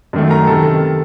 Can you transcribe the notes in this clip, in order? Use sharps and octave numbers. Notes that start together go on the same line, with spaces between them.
F#2 D#3 A3
A#4 A#5
C3 D#3 A4 A5